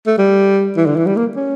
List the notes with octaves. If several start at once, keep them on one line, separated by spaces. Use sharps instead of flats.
A3
G3
E3
D3
E3
G3
A#3
C#4